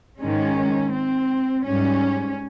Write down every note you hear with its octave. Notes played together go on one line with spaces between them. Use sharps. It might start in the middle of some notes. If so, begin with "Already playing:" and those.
G#2 D#3 G#3 C#4
C4
G#2 G3 C#4